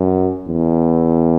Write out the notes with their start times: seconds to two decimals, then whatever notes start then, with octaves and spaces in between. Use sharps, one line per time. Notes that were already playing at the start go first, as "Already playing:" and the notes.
Already playing: F#2
0.48 E2